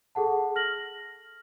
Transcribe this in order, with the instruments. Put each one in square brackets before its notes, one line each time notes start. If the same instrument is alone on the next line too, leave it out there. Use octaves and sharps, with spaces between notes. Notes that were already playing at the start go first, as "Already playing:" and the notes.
[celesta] G#4 A4 F#5 A5
F6 A#6 F#7